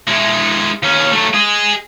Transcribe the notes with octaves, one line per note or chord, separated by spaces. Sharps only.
G#3 E4
D#2 C#4
F#3 A3
G#4 D#5